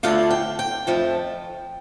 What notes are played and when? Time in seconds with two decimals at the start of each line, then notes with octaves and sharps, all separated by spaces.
0.03 D2 D3 A3 D4 F4 F5
0.30 G5
0.59 G5
0.87 F2 F3 A3